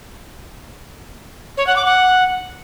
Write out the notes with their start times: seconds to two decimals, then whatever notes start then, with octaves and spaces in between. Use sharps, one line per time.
1.57 C#5
1.67 F#5
1.76 D6
1.85 F#5